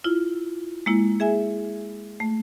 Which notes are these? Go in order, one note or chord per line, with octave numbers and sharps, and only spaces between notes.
E4 F4
G#3 A#3 E4
G#4 E5 G#5
A3